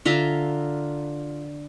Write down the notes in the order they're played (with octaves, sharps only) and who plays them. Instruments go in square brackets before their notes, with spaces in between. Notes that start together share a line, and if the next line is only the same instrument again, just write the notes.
[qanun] D3 F4 E5 A#5